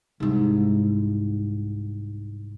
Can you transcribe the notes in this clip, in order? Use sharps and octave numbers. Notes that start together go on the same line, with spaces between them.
C2 G#2